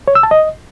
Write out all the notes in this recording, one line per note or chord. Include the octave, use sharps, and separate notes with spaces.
C#5
E6
A5
D#5